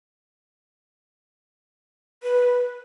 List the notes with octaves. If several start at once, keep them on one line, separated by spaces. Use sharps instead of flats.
B4